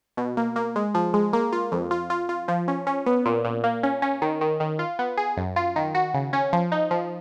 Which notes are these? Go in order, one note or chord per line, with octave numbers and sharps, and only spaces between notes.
B2
A#3
A#3
G#3
F3
G#3
A#3
F4
F2
F4
F4
F4
F3
C#4
C#4
B3
A#2
A#2
A#3
C#4
C#4
D#3
D#3
D#3
F4
B3
G#4
F#2
F4
D#3
F#4
C#3
C#4
F3
D#4
F3